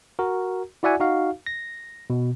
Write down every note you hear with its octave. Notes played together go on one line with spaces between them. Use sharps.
F#4 A#4
E4 F#4 D5 E5 F#5 G#5
D#4 F#4 F5
A#6
B2